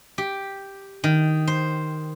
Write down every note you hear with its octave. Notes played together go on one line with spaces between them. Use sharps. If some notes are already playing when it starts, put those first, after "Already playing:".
G4
D#3
C5